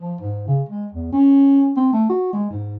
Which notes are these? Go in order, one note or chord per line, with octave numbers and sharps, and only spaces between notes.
F3
G#2
C#3
G#3
E2
C#4
C4
A3
F#4
G#3
G#2